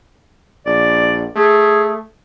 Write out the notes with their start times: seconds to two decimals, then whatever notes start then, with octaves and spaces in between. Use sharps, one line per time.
0.66 A#1 D5
1.36 A3 G#4